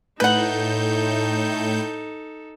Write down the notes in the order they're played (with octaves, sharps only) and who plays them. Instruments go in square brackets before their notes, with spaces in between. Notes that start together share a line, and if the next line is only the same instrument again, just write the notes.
[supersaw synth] A2 G6 [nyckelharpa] D#4 A4 [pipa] B4 F#5